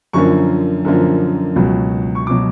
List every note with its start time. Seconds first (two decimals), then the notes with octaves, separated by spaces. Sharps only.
0.13 F#2 D3 F3 A#3 C#6
0.85 F#2 D3 F3 A#3
1.56 C#2 B2 F#3
2.15 C#6
2.27 B2 F#3 D6